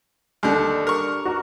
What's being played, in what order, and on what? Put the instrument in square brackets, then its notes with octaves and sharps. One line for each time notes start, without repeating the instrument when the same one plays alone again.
[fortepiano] D#2 D3 [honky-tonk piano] G3 D4
[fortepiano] A#4 C#6
[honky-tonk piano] F#4 A#5